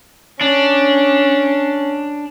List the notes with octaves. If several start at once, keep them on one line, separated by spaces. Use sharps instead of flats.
C#4 D4